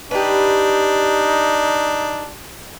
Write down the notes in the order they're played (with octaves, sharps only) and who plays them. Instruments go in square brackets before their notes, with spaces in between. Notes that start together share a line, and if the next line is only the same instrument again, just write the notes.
[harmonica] D4 [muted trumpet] D#4 [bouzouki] G4 B4